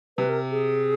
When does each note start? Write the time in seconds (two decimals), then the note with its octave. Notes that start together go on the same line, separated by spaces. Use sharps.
0.17 C3 B4
0.29 A#4
0.51 G#4